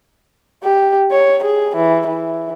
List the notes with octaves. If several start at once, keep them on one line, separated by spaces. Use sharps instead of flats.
G4
C#5
G#4
E3
E3